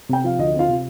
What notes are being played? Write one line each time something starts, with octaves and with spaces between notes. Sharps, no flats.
C3 G5
F3 F5
D2 D#5
C4
F4 F5
C3